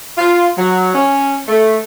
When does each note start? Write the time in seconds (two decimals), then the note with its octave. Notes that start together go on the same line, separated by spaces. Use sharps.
0.18 F4
0.58 F#3
0.95 C#4
1.47 A3